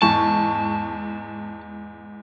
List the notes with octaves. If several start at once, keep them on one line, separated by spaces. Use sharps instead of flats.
E2 G#2 A5 C#6